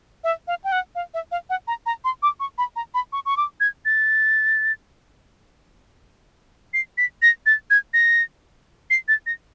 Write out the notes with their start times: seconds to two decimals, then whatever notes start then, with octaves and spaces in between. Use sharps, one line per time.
0.24 E5
0.48 F5
0.64 G5
0.72 F#5
0.95 F5
1.14 E5
1.32 F5
1.50 F#5
1.68 A#5
1.86 A#5
2.04 C6
2.23 D6
2.40 C#6
2.58 B5
2.76 A#5
2.94 B5
3.13 C#6
3.26 C#6
3.37 D6
3.60 G#6
3.85 A6
6.74 C7
6.98 B6
7.22 A#6
7.46 A6
7.70 G#6
7.94 A#6
8.90 C7
9.08 A6
9.26 A#6